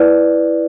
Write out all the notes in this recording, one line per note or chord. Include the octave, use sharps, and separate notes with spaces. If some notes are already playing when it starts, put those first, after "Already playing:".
Already playing: E4 B4 D5